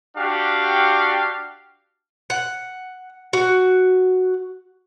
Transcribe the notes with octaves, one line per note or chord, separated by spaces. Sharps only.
D4 F#4 G4 F5
F#5
F#4